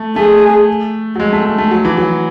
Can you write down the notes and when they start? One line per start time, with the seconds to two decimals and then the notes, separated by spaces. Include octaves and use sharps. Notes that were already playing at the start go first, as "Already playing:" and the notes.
Already playing: A3
0.16 A3 G#4
1.15 F#3
1.20 G#3
1.33 A3
1.46 A3
1.58 A3
1.71 F#3
1.85 E3
1.97 F#3